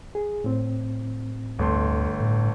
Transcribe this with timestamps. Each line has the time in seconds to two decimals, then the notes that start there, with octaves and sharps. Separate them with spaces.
0.15 G#4
0.44 A2 C4
1.59 G1 D2 A3 C6
2.20 A2